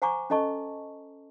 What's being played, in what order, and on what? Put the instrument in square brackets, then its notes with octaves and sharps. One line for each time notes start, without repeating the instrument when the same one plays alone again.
[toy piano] C5 F#5 G#5 A#5 C#6 D6
C#4 A4 D#5 A5 C#6